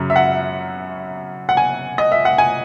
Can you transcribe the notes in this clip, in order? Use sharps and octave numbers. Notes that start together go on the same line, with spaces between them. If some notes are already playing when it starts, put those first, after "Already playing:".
Already playing: F#2 C#3 F#3
E5
F#5
F#5
G#5
D#5
E5
F#5
G#5